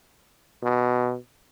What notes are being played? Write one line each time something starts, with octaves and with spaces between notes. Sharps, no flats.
B2